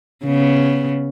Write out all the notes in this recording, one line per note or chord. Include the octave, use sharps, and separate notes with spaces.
C#3 B3